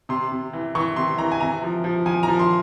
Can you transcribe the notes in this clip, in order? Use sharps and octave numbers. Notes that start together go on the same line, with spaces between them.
C3 C6
C3
E3
E3 C#6
C3 C6
E3 A#5
G#5
C3 A#5
F3
F3
F3 G#5
A#5
F3
C6